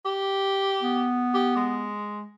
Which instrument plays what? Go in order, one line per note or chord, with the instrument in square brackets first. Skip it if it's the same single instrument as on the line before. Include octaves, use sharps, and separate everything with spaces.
[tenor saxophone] G4
[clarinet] B3
[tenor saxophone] G4
G#3